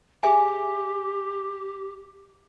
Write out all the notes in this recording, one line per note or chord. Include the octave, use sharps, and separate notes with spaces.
G4 G#4 E5 G#5